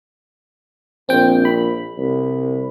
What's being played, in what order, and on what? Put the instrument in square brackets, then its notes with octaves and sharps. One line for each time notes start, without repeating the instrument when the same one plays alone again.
[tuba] A#1 [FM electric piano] C4 G5
[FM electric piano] B5
[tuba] C2